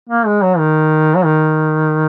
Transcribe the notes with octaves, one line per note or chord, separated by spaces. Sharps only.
A#3
G#3
F#3
D#3
F#3
D#3